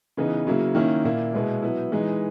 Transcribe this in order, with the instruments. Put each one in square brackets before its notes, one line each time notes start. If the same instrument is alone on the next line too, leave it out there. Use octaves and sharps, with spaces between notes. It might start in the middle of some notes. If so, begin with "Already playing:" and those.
[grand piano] C#3 E3 B3 D#4
C#3 F#3 A#3 E4
D#3 A#3 C#4 E4
A#2 A#3 E4
B2 G#3 B3 E4
F#3 B3 E4
E3 G#3 D#4